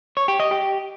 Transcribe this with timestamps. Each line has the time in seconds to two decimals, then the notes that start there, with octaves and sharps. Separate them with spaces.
0.17 C#5
0.28 G4
0.40 D#5
0.51 G4